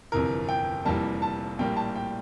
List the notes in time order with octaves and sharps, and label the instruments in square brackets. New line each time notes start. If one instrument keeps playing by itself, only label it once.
[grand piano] G1 F2 C3 E3 A#4
G5
F1 F2 E3 G3 A#3 A5
A5
A#1 A2 G3 A#3 G5
A5
G5